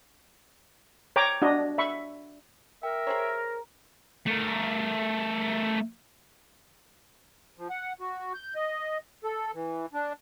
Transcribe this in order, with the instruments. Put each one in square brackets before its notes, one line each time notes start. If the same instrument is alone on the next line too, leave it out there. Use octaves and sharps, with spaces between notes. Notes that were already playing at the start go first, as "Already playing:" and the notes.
[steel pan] C#5 G5 A#5 D6
D4 F#4 D#5
E5 B5 C#6
[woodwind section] A#4 [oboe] E5 [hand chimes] G5
[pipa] G#4 C5 C#5 [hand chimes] A#5
[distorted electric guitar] A3 A#4
[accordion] F3
F#5
F#4
G6
D#5
A4
E3
D4